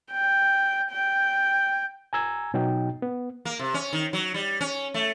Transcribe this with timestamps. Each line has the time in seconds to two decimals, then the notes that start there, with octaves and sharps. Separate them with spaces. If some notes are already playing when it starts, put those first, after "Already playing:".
0.12 G5
0.92 G5
2.13 G#5 A#5 E6 G#6
2.54 B2 F#3 D#4 G5
3.02 B3
3.45 A#3
3.59 C3
3.74 C#4
3.93 D#3
4.13 F#3
4.34 G3
4.61 C#4
4.94 A3